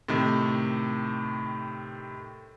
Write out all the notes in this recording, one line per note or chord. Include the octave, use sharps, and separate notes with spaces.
A2 C3 D#3